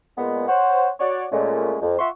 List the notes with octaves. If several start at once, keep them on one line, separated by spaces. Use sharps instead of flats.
A#2 G#3 B3
C5 C#5 F#5
F#4 C#5 D5
A#2 G#3 A3 C#4
F2
F4 E5 F#5 C6 C#6